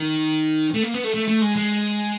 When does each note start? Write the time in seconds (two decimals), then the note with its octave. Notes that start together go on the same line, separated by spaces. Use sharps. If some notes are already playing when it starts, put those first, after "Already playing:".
Already playing: D#3
0.74 A3
0.83 A#3
0.94 B3
1.04 A3
1.14 A3
1.28 A3
1.41 G#3
1.56 G#3